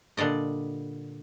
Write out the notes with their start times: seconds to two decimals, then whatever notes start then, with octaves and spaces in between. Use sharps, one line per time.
0.17 A#2 D3 G3 D5 D#5